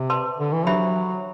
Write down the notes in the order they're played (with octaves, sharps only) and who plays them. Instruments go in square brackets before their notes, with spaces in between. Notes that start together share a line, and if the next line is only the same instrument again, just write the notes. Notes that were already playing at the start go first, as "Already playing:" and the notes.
Already playing: [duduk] C3
[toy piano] B4 D5 A5 C6
[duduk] D3
E3
[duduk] F#3 [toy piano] D4 G4 C5 E5 B5